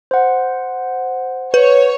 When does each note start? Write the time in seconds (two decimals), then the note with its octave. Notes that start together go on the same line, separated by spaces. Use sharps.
0.11 C5 F#5
1.54 B4 C#5